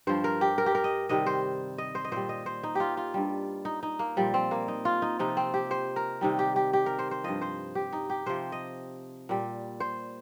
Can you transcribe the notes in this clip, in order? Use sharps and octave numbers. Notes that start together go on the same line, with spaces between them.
G2 F3 C5
A#4
G4
A#4
G4
A#4
D#5
C3 D#3 G3 D#5
C5
D#5
C5
D#5
A#2 G3 C5
D#5
C5
D#4
F4 G4
F4
G2 G3
D#4
D#4
A#3
A#2 F3 G3
C4
A#3
D#4
F4
D#4
C3 F3 D#4
C4
G4
C5
A#4
C3 D#3 G3 D#4
G4
G4
G4
A#4
C5
C5
G2 F3 D#5
C5
G4
D#4
G4
C3 F3 C5
D#5
A#2 G3
C5